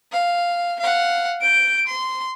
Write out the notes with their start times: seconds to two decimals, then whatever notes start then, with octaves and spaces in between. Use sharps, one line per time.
0.13 F5
0.80 F5 F#5
1.41 G6 D7
1.87 C6